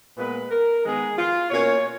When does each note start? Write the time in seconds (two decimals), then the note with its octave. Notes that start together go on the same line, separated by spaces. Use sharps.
0.17 A#2 G#3 B3 B4
0.51 A#4
0.83 D#3 G#3 B3 G#4
1.18 F4
1.50 B2 A#3 C#4 C#5